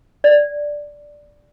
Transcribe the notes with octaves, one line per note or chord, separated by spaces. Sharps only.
D5